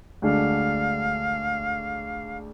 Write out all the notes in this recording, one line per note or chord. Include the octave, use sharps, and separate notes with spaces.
D2 D3 G#3 D4 F5